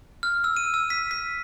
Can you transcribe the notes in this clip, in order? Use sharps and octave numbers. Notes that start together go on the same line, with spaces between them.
F6
E6
D#7
E6
B6
B6